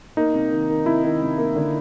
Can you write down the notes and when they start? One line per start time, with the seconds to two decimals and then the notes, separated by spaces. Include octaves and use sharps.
0.17 A#3 D#4
0.34 C3
0.51 D#3
0.69 D#3
0.86 C3 E4
1.04 D#3
1.22 C3
1.38 A#3
1.56 D3